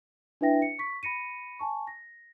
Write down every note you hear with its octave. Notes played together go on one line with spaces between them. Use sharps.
D4 E4 B4 E5 G5 A#6
C#7
C#6 B6
B5 A#6 C#7 D#7
G#5 A5 C#6
A#6